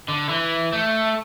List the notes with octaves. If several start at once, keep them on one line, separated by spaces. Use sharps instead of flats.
D3
E3
A3